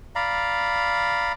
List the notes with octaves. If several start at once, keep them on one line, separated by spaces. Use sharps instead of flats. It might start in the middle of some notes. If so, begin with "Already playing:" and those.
D5 F5 A#5 B5